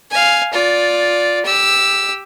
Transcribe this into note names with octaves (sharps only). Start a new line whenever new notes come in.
F5 G#5
F4 D5
G4 E6